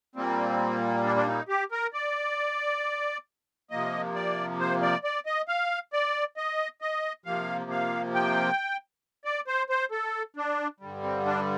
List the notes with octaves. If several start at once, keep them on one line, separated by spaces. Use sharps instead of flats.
A#2 G3 A#3 C4
D4
D4
D#4
G4
A#4
D5
C3 F3 A#3 D#5
D5
C5
D5
D5
D#5
F5
D5
D#5
D#5
C3 F3 A#3 F5
F5
G5
D5
C5
C5
A4
D4
G2 D3 G3
C4
D4